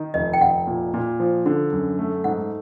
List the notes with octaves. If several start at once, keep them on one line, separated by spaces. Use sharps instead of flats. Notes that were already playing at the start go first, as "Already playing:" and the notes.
Already playing: D#3
F1 D#5
G5
F1 F#5
A#2
A#2
F3
D3
F#2
A3
G#2 F#5